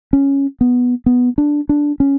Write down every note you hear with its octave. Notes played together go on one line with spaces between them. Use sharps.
C#4
B3
B3
D4
D4
C#4